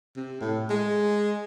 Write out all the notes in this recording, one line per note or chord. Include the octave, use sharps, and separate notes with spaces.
C3
A2
G#3